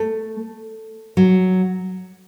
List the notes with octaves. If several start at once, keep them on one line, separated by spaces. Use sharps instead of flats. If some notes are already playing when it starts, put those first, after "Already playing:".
Already playing: A3
F#3